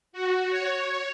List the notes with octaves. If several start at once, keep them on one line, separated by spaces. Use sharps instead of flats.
F#4
C#5